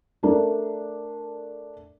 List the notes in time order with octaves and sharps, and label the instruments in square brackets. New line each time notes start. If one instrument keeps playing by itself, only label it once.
[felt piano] A3 D4 A4 A#4